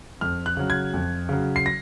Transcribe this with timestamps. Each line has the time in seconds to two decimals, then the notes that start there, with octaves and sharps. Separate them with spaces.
0.21 F2 F6
0.46 F#6
0.57 C#3 F#3
0.70 G#6
0.94 F2
1.29 C#3 F#3
1.56 C7
1.66 A#6